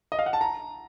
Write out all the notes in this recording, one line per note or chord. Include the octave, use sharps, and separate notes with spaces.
D#5
F5
F#5
A5
A#5